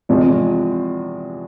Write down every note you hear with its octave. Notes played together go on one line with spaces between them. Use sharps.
E2 C3 F3 G#3